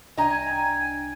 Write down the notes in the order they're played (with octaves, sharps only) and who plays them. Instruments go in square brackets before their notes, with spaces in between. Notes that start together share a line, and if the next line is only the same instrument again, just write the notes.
[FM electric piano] C2 D4 G5 [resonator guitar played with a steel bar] D#5 A#5 [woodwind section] G#5